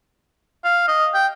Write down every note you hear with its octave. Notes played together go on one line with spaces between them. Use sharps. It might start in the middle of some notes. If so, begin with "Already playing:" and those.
F5
D#5
G5